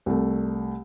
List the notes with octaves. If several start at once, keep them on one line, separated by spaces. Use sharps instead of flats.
C2 A3